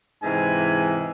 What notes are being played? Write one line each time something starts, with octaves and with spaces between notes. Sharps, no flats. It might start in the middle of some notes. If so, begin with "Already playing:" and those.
G#2 C3 E3 G#5